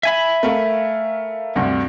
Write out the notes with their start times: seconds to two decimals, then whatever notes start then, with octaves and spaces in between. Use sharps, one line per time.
0.03 E5 G#5 B5
0.43 A3 A#4 F5
1.55 D2 G2 C3